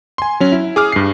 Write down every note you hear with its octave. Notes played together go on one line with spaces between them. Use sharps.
G#5 C6
F#3 C#4
E4
G#4 D6 F6
G2 C7